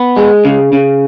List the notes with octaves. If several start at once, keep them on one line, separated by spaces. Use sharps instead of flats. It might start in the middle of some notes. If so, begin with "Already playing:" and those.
Already playing: B3
G#3
C#3
C#3